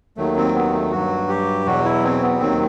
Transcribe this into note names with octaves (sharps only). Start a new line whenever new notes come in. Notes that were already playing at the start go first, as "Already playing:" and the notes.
D#2 D#3 F#3 A3
C4
B3
A3
G2 F#3 F#4
G4
E2 B2 F#3 F#4
E4
C4
B3
D#2 D#3 F#3 C4